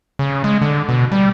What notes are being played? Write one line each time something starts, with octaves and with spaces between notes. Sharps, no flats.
C#3
G#3
D3
B2
G3